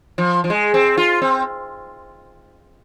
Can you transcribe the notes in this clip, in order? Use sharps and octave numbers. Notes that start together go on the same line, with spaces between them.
F3
F3
G#3
C4
F4
C4